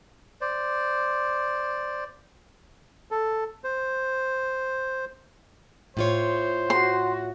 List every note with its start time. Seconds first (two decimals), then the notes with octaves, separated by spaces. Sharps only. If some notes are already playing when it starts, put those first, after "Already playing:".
0.41 C5 D5
3.11 A4
3.64 C5
5.97 A2 F4 C5 C#5
6.70 F#4 C6